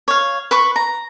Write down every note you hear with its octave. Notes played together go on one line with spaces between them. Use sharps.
C#5 F5
B4 B5 C#6
A#5